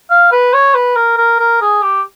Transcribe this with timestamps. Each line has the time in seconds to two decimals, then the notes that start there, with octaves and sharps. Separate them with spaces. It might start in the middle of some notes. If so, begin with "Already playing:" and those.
0.11 F5
0.32 B4
0.54 C#5
0.75 B4
0.96 A#4
1.18 A#4
1.39 A#4
1.61 G#4
1.82 G4